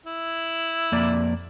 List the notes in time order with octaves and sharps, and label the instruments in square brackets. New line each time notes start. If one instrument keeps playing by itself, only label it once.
[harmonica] E4
[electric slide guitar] F2 A#3 D5